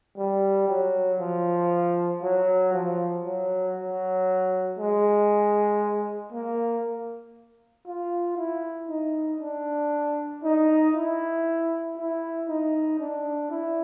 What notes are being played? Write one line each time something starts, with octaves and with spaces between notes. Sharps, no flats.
G3
F#3
F3
F#3
F3
F#3
F#3
G#3
A#3
F4
E4
D#4
D4
D#4
E4
E4
D#4
D4
E4